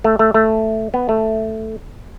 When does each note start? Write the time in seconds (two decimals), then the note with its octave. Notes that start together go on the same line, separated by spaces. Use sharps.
0.04 A3
0.19 A3
0.34 A3
0.94 B3
1.09 A3